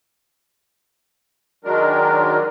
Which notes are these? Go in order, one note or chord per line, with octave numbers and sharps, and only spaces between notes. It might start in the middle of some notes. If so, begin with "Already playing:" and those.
D#3 F#3 G#3 D4 A#4